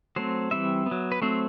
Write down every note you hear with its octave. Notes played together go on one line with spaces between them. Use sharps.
F#3 A3 C4 C5
E3 G3 C4 E5
B3
F#3
B4
F#3 A3 C4 C5